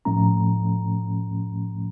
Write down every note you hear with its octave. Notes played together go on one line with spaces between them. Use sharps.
A2 F3 A3 C#4 A#5